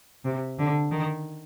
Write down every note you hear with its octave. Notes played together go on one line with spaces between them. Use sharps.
C3
D3
D#3